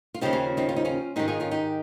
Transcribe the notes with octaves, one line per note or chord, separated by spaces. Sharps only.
F4
D#2 C#3 F3 D#4 G4
C#4 F4
C4 D#4
F4
D#4
C#4 F4
G#2 D#3 D#4 G4
F4 G#4
C#4 F4
D#4 G4